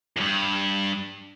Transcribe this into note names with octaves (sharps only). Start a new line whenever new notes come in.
E2 G2